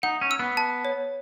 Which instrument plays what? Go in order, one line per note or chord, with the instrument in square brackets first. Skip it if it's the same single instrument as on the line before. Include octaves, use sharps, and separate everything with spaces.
[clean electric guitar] D#4 [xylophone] F#5
[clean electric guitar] C#4
[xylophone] E6
[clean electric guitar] B3
[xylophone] A5
C#5